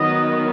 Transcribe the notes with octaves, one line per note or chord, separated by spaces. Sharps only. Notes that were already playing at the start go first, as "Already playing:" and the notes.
Already playing: D#3 F#3 B3 D#5